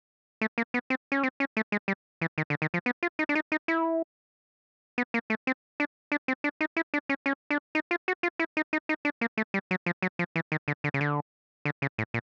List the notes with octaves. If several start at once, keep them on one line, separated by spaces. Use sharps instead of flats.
A3
A#3
B3
C4
C#4
C4
C#4
A3
G#3
G3
E3
D#3
D3
D#3
F3
B3
F4
D#4
D4
D#4
D#4
E4
B3
A#3
A3
C4
D4
D4
C4
D4
D#4
E4
D4
C#4
C#4
D4
D#4
F4
F#4
F4
E4
D#4
D#4
D#4
D4
A#3
A3
G3
F#3
F3
F#3
F3
E3
D#3
D3
D3
C#3
D3
D3
C#3
A2
A#2